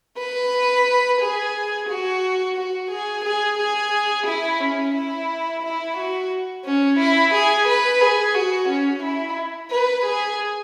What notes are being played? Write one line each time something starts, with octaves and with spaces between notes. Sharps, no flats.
B4
G#4
F#4
F#4
G#4
G#4
G#4
E4
C#4
E4
E4
F#4
C#4
E4
G#4
B4
G#4
F#4
C#4
E4
B4
G#4